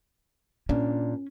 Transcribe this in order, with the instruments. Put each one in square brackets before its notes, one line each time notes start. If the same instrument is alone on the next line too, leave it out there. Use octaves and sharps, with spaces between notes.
[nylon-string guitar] A#2 D4 [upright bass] C#4